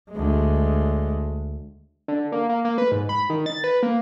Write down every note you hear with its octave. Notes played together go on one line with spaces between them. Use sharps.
D2 G#3
D3
A#3
A#3
A#3
B4
G#2
B5
D#3
A6
B4
A#3